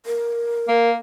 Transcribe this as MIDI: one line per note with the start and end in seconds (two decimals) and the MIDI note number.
0.06 0.97 70
0.68 0.95 58